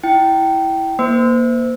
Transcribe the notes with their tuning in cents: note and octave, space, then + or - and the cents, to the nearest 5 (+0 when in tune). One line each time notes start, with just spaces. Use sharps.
E4 +0 G5 -20
A#3 +15 C5 -30